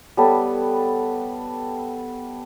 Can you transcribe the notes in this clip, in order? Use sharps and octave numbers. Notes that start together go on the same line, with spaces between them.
G3 B3 A4 C#5